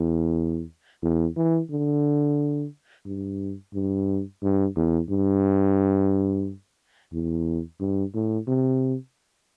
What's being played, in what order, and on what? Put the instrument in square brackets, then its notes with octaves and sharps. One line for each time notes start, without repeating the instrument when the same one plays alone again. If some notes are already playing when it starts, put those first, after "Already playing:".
Already playing: [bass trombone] E2
E2
E3
D3
G2
G2
G2
E2
G2
E2
G2
A2
C3